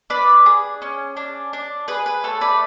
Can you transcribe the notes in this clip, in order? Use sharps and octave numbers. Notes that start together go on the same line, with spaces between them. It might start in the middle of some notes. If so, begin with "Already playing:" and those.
D4 B4 D5
G#4
C#4
D4
D4
G#4 B4
B4
A3 A4 C#5
B4 D5